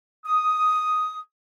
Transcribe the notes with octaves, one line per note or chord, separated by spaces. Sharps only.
D#6